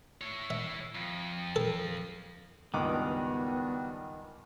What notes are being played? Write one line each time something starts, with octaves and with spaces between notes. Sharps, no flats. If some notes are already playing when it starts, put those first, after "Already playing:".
E4 C#5
E5
F2
A4
C#2 G2 D#3 G3 B3 D4 F#4 D6